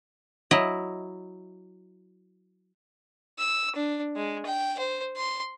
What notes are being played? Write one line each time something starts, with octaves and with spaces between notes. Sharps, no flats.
F#3 E4 D#5
E6
D4
G#3
G5
C5
C6